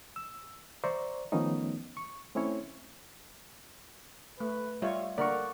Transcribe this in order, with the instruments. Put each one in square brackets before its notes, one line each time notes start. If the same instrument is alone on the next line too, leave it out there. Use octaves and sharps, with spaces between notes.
[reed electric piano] E6
C5 D5 E5 A#5 C#6
D#3 F3 A3 B3 C#4 D#4
C#6
A3 C4 C#4 E4 C#5
[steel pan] A3 [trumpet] B4
[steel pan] G3 F4 C#5 [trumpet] E5
[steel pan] D3 A#3 A#4 [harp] D5 C#6 [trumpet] F#5